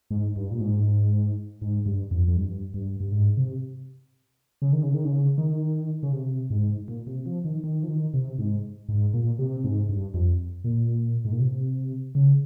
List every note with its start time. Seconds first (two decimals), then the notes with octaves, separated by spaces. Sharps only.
0.10 G#2
0.36 G2
0.51 A#2
0.61 G#2
1.61 G#2
1.86 G2
2.11 F2
2.28 F2
2.37 G2
2.74 G2
3.00 G2
3.12 G#2
3.37 C3
4.62 C#3
4.73 D#3
4.83 C#3
4.94 D#3
5.05 C#3
5.38 D#3
6.03 C#3
6.13 C3
6.50 G#2
6.88 A#2
7.07 C3
7.26 F3
7.44 D#3
7.64 D#3
7.83 F3
7.89 D#3
8.14 C3
8.39 G#2
8.89 G#2
9.14 A#2
9.39 C3
9.64 G#2
9.89 G2
10.14 F2
10.64 A#2
11.25 G#2
11.32 A#2
11.40 C3
12.15 C#3